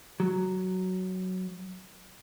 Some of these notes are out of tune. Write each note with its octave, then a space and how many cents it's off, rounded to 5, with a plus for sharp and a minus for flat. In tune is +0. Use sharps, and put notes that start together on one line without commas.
F#3 +5